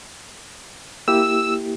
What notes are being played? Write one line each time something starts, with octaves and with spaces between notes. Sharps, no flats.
A#3 E4 G4 E6